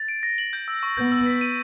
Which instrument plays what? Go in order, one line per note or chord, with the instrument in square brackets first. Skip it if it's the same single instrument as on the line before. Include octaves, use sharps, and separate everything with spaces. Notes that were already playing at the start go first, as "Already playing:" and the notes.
Already playing: [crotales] A6
D7
A#6
F#7
G6
E6
C#6
[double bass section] B3 [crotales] G6
[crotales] E6
B6
D#7